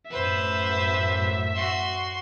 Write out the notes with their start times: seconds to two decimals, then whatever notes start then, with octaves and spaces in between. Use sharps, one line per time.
0.11 F#2 A2 B4 C5 E5
1.55 F#4 C6